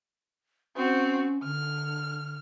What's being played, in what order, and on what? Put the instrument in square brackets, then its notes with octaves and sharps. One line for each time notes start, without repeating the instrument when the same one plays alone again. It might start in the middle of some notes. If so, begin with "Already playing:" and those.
[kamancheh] C4 F#4 [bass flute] C#4
[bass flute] D3 [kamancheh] F6